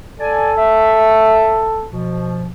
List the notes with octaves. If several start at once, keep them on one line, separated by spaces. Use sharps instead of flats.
A4 D5 G#5
E5
B2 F3